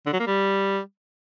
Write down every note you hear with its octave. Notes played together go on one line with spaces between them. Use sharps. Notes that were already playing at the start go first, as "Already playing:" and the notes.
D3
F#3
A#3
G3